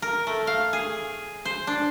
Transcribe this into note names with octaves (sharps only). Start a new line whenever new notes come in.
A#4
A3
F5
G#4
C5
D4